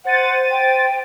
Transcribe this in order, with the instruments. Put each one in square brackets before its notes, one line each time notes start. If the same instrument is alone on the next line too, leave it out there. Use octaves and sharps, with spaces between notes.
[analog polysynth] C5 A6 D#7 [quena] F#5
[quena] G5